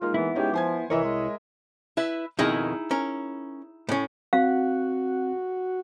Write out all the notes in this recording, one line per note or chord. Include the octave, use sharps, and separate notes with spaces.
G#3 A#3 D#4 F4
E3 B3 E4
G#3 C#4 D#4 G4
F3 C5 G#5 G#6
C2 E3 E4 A#4 C#5 D#5 E5
G#3
E4 B4 E5
F2 B2 D#3 D#4 E4 G#4
C#4 A#4
A2 C#4
C4 F#4 F5 F#6